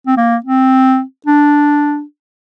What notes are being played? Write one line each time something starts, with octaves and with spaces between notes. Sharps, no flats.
C4
A#3
C4
D4